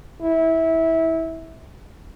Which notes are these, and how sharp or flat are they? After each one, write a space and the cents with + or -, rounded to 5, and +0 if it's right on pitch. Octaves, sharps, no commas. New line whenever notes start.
E4 -20